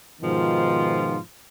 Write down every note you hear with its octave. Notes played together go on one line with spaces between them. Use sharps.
G#2 B2 D#3 F3 F4